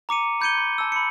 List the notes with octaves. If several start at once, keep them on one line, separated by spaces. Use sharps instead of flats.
A#5 D6 C#7 D#7
B5 G6 G#6 C#7 D#7 G7
C6
A5 E6
B5 C#7